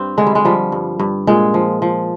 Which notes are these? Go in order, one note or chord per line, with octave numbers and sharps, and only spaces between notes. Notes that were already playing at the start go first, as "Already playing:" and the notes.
Already playing: G2 C4
D3 G#3
G3
G#3
F3 G3
G2
G2
A#2 G#3
F3
F3